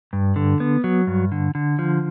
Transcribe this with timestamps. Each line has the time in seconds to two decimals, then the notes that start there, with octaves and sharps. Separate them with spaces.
0.13 G2
0.36 D3
0.60 B3
0.84 F#3
1.07 G2
1.32 D3
1.55 D3
1.79 F3